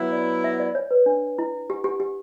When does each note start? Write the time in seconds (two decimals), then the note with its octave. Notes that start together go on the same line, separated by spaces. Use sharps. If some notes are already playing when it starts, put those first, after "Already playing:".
Already playing: F#3 B3 E4
0.13 D5
0.44 E5
0.60 D5
0.75 C#5
0.91 B4
1.06 D4
1.39 E4
1.70 G4
1.84 G4
2.00 G4